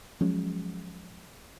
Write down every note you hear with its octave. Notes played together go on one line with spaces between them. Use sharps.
F3 F#3 G#3 C#4